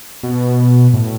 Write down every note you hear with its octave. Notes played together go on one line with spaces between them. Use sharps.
B2
A2